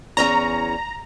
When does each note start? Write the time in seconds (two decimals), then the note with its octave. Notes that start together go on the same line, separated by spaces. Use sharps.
0.17 E2 C#4 C#5 A#5